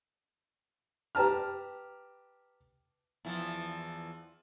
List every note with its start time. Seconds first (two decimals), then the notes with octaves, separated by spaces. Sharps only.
1.15 G4 B4 A5 A#5 F6
3.25 E2 E3 F3